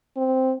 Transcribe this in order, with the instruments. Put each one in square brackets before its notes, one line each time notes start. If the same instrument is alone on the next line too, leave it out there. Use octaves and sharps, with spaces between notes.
[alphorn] C4